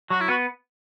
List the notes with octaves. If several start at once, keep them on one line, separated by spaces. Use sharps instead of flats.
F#3 F#4
E4
B3 F#4